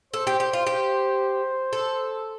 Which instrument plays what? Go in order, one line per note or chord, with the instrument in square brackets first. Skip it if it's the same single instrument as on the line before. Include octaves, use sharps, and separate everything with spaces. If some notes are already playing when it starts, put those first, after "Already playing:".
[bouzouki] A4 [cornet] C5
[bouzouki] G4
G4
F4
G4
A4